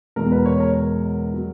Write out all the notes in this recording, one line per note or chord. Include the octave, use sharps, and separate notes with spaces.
E2 B2 G#3 A#4
B4
C#5
A#4
F#3